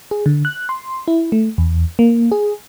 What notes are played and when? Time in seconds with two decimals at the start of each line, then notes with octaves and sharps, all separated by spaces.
0.11 G#4
0.26 D3
0.45 F#6
0.69 C6
1.08 E4
1.32 A3
1.58 E2
1.99 A#3
2.32 G#4